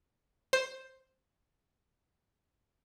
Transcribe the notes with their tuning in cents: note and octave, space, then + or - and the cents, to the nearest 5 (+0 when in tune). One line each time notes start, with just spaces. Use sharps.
C5 +5